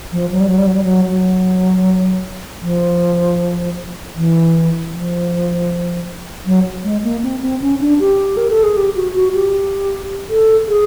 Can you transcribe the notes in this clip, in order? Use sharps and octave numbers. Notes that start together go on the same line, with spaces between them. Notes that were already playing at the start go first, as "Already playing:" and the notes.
F3
F#3
G3
F#3
G3
F#3
G3
F#3
F#3
F3
E3
F3
F#3
G#3
A#3
C4
C4
C#4
D4
G4
A#4
A4
G#4
G4
F#4
F#4
G4
A4
G#4